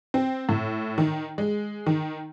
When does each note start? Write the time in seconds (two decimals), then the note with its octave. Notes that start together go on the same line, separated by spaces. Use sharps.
0.14 C4
0.49 A2
0.98 D#3
1.38 G#3
1.86 D#3